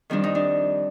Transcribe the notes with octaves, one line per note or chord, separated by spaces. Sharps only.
F2 D#3 G3 D4
D#4
D4